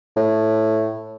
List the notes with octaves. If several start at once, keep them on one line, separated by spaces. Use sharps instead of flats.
A2